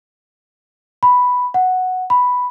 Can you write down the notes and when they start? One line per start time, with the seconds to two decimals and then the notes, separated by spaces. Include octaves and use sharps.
1.03 B5
1.54 F#5
2.10 B5